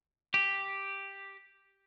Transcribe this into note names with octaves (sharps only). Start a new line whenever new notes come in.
G4